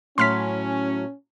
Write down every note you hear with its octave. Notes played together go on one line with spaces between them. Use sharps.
A2 F#3 A3 C#4 C6 F6 B6